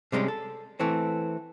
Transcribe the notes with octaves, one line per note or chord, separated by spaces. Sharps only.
C3 G3 G#3 C4 C#4
A4
E3 A3 C4